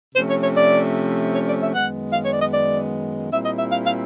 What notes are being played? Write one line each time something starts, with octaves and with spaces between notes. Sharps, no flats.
C3 F3 A3 C#4 C5
C#5
C#5
D5
C#5
D5
E5
F#2 D#3 G#3 B3 F#5
F5
C#5
D5
D#5
D5
A#2 G3 C4 E4 E5
D#5
E5
F5
F5